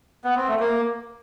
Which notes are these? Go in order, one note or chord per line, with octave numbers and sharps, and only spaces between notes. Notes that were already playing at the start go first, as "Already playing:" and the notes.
B3
C4
A3
A#3